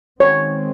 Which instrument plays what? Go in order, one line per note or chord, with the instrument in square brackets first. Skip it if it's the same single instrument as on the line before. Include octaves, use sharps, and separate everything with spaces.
[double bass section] D#3 G#3 C4 [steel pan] C#5